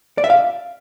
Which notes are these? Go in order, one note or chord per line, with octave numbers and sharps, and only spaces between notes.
D5
E5
F5